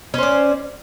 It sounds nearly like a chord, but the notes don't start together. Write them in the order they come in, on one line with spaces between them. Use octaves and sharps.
C#4 C5 D5